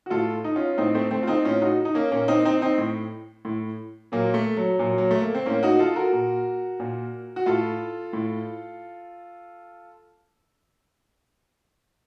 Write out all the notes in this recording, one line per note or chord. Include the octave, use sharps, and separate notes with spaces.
F#4
A2 F4 A4
D#4
C#4 F4
A2 C4 D#4
A3 C4
A3 C4
F4
C4 D#4
A2 C#4 F4
D#4 F#4
D#4
A#3 C#4
A#2 A#3 C#4
C4 D#4
C4 D#4
C4 D#4
A2
A2
A#2 F#3 A#3
A3
F#3
A#2 F#3
F#3
A3
A#3
C4
A2 A#3 C#4
D#4 F#4
F4 A4
F#4 A#4
A#2
A#2
F#4
A2 F4 A4
A2